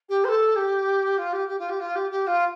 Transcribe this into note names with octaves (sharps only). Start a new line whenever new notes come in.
G4
C5
A4
G4
F4
G4
G4
F4
G4
F4
G4
G4
F4